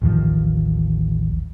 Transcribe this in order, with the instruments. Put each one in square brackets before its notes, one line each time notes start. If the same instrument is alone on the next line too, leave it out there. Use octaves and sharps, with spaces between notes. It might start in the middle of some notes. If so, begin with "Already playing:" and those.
[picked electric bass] A1 D#2 D#3 F3